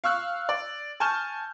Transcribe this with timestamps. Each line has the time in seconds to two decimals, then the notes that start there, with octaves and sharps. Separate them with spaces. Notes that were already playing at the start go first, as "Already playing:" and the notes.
0.04 F5 C#6 E6 F#6
0.49 D5
1.00 G#5 A5 C#6 F6 G6 E7